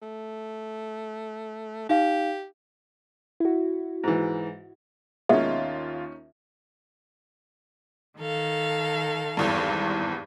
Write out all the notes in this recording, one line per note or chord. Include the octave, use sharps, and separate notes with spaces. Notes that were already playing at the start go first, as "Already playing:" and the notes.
A3
D#4 G4 F5
E4 F#4
G#2 E3
D#2 B2 G#3 A#3 C#4 D#4 F4 E5
D#3 A4 F5
G#1 E2 G2